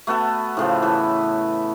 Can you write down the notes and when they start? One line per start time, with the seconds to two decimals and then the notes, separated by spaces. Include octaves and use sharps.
0.07 A3 B3 F#4 A4
0.57 A2 C#3 F3
0.82 E3 A4 B4